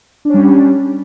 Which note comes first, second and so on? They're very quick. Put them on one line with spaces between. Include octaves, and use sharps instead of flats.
D4 C#4 G3